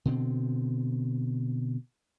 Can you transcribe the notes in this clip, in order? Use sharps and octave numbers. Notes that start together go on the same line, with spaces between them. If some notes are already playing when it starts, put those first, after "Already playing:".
B2 D3 C4